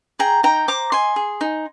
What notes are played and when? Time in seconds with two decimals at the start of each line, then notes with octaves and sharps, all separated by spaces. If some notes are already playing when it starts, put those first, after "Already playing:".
0.19 G#4 G5 A#5
0.43 D#4 G5 A#5
0.68 C5 A#5 D6
0.92 D#5 G#5 C6
1.16 G#4
1.41 D#4